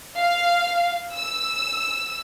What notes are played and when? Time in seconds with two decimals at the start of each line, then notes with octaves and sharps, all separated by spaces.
0.16 F5
1.14 E6